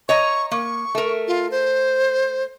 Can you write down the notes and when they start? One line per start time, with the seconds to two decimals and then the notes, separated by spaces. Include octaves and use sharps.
0.09 C#5 D#5 A#5 C#6
0.51 A#3 C#6
0.95 A3 A#4
1.28 F4
1.51 C5